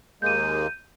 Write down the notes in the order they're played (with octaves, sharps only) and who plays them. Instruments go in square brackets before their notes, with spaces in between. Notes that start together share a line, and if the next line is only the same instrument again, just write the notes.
[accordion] D#2 G#3 A#3 [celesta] G6 D#7